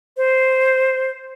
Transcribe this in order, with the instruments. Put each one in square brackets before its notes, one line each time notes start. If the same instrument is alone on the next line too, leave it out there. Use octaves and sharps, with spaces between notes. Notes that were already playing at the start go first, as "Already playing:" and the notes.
[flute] C5